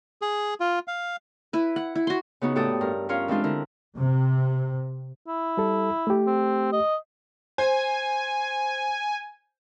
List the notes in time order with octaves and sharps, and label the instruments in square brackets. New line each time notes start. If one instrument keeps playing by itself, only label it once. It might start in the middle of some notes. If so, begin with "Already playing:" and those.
[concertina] G#4
F4
F5
[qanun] E4 B4
F#5
E4
F#4 C6
[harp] C#3 B3 D#4 F#4
A2 F#4 G4 A4 D5 D#6
G2 A#4
C#4 F4 A#4 C#5 F5
E3 G#3 C4 D4 F4
D3 E4 A#4
[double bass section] C3
[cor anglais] E4
[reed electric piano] G3 A4
A3 G4
[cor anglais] C4
D#5
[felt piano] C5 [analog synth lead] G#5